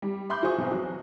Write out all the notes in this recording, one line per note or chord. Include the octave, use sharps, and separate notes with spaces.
G3
E5 B5 C6 D6 G6
F4 F#4 G#4 C5 C#6 D#6
B1 E2 C4
F#3 F#4